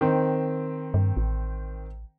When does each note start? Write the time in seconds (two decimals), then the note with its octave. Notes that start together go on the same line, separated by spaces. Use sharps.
0.01 D#3 C4
0.94 G2
1.17 A1